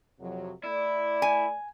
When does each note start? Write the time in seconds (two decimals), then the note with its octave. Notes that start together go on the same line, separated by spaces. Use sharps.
0.20 F2 C3 F#3
0.64 A3 E4 D5
1.22 G#5